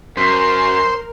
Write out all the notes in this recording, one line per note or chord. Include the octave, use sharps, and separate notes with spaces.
F#2 A#4 C5